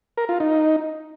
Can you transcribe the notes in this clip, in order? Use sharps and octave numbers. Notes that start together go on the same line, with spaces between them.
A#4
F4
D#4